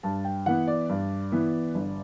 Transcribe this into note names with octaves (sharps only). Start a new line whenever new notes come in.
G2 A5
G5
E3 B3 F#5
D5
G2
E3 B3
G1